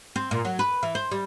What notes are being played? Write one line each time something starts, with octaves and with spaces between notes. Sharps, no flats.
C4
A#2
F#3
B4
E3
C5
G3